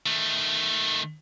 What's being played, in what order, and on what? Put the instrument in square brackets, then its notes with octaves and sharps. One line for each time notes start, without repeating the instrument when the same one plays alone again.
[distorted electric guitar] D#3 A3